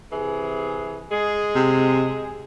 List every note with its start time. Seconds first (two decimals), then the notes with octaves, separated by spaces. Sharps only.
0.12 C3 E3 G#4
1.11 G#3 G#4
1.55 C3